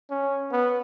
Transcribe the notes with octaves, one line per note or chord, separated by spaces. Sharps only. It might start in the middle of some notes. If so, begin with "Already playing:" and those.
C#4
B3